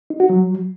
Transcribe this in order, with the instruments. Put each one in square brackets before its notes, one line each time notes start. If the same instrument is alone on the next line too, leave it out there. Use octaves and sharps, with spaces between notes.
[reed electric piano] D#4
F#4
F#3